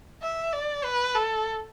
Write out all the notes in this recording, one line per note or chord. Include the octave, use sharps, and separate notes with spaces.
E5
D5
B4
A4